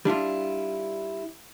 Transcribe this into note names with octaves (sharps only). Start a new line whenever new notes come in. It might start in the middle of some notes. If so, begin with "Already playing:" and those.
G3 D4 E4 F4